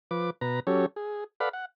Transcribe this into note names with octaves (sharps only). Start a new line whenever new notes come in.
F3 B4 D6
B2 B4 A#5
F#3 C#4 G4 A4 C#5
G#4
A4 B4 D5 F5 F#5 B5
F#5